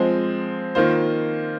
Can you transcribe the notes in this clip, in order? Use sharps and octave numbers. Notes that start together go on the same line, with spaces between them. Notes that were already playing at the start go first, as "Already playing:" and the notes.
Already playing: F3 G#3 C4
D#3 A#3 F4 C5